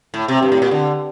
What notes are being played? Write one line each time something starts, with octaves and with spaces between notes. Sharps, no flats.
A2
C3
G2
A2
A#2
D3